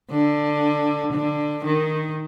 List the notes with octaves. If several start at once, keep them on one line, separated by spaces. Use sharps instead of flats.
D3
D3
D#3